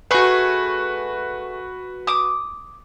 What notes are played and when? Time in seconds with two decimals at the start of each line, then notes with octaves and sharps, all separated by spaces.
0.11 A3 F#4 G#4 B4
2.07 D6 D#6